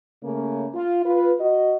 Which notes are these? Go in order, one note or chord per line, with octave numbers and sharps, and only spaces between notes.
C#3 A3 A#3 C#4
F4
F4 B4
F#4 D#5